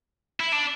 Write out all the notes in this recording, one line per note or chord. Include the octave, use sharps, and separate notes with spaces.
E4
D4